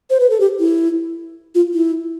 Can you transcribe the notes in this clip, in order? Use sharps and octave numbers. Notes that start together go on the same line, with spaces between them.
C5
B4
A4
G4
E4
F4
E4